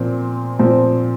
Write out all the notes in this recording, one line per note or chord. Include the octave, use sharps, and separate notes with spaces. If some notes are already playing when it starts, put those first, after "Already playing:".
Already playing: A#2 F3 C4
A#2 F3 C4